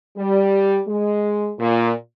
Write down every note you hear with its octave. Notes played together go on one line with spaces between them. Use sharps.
G3
G#3
A#2